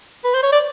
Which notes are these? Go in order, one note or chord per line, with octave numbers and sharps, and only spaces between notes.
B4
C5
C#5
D5